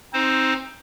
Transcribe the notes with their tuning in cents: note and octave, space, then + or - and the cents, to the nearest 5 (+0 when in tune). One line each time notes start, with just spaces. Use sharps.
C4 +15 D#4 +15 C5 +0